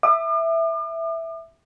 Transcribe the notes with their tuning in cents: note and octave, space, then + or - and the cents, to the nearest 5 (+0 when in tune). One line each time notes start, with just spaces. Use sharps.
E5 +0 D6 +45